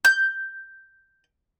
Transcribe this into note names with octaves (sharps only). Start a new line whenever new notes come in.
G6